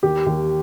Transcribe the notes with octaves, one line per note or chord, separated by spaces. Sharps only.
D#2 G4
D#2